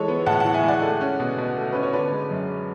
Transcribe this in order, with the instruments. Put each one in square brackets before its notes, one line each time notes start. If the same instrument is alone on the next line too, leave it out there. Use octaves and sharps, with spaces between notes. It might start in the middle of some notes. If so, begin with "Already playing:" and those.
Already playing: [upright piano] E3 G#3 A4 C#5
B3
A2 F#5 A5
F#5 A5
E3
E5 G#5
G#3 D5 F#5
A3
C#4
B2
B2
A3
C#4 B4
C#5
D3 B4 D5
G#3
F#2